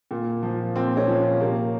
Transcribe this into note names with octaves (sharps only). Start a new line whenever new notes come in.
A#2
F3
A#2 C4
C#4
F3
C3 A#3